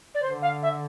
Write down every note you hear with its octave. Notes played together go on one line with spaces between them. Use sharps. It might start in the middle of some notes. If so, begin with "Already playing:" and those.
D5
D3 C5
F5
E5